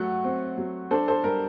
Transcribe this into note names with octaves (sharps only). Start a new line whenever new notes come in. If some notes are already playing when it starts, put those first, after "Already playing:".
Already playing: F#3 A3 F#5
C4
F#3
D4 A4 C5
A4 C5
G3 G4 A#4